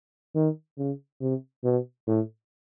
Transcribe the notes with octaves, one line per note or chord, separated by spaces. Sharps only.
D#3
C#3
C3
B2
A2